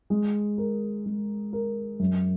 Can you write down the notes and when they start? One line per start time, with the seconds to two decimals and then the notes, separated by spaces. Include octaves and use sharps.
0.10 G#3
0.58 A#4
1.06 G#3
1.53 A#4
1.99 F#2